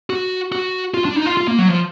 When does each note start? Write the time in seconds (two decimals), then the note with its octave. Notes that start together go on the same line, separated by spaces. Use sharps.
0.10 F#4
0.52 F#4
0.94 F4
1.05 D4
1.16 D#4
1.26 F4
1.37 F4
1.48 A#3
1.58 F#3
1.69 F3